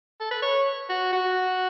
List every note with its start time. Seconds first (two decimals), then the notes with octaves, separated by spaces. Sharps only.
0.20 A4
0.31 B4
0.42 C#5
0.89 F#4
1.13 F#4